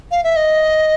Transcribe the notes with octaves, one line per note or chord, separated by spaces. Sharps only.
F5
E5
D#5